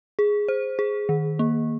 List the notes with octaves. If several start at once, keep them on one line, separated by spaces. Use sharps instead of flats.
G#4
C5
G#4
D#3
A#3